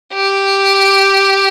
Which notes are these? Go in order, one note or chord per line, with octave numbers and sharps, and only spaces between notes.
G4